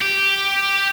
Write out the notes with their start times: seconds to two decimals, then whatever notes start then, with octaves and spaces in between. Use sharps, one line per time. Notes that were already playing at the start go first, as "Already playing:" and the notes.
0.02 G4